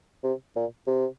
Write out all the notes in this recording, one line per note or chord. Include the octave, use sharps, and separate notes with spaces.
C3
A#2
C3